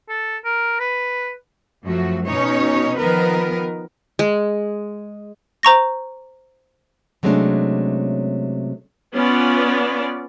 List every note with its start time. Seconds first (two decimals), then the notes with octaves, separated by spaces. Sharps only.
0.09 A4
0.45 A#4
0.80 B4
1.85 F#2 F3 A3 F#4
2.27 B2 C#4 D#4 C#5
2.97 D#3 F3 B3 A#4 B4
4.19 G#3
5.63 C5 A#5 C#6 A#6
7.23 C3 F#3 G#3 A3 C#4 D4
9.15 B3 C#4 F4 D5